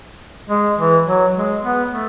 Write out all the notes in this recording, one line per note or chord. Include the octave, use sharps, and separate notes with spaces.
G#3
E3
F#3
G#3
B3
A3